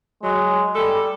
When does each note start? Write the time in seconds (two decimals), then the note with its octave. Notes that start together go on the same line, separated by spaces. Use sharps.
0.23 F#3 G#3
0.75 G3 A4